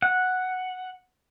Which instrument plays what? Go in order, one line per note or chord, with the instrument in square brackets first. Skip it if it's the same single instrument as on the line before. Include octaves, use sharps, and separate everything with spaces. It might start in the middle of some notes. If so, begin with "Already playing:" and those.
[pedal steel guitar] F#5